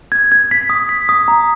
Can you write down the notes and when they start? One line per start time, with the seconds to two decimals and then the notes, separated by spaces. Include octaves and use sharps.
0.12 G#6
0.32 G#6
0.51 B6
0.70 D#6
0.89 B6
1.09 D#6
1.28 A#5